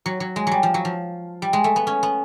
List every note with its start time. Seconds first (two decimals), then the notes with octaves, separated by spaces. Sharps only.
0.06 F#3
0.20 F#3
0.36 G#3
0.47 F#3 G3
0.63 F3
0.74 F#3
0.85 F3
1.42 G3
1.53 G#3
1.64 A3
1.76 B3
1.87 C#4
2.03 B3